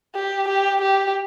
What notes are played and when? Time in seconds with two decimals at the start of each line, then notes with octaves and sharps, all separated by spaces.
0.15 G4
0.48 G4
0.81 G4